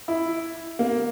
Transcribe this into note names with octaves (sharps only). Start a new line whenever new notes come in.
E4
A#3